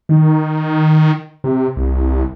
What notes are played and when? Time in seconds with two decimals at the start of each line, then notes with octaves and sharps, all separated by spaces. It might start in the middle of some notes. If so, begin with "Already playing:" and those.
0.09 D#3
1.44 C3
1.77 C2